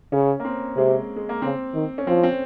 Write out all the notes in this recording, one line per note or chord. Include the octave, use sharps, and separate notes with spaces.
C#3 C#4
A#3
C4
C3 G#3
G#3
A#3
C#3 C4
D#3
C#4
F3 C4
C4